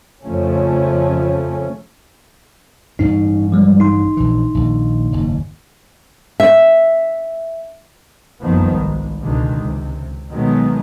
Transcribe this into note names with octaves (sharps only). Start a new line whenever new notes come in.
F2 C#3 F3 A3 C#4
A1 G2 C#4 D#4
F3 G3 G#3
D#4 C6
A#1 E3
A#1 D#2
F#1 D#2 G#2
E5
F#1 C2 D#3 F3 B3
G#1
C#2 B2 D3 D#3 G#3
C#2 C3
B2 D#3 F#3 G#3 A3 B3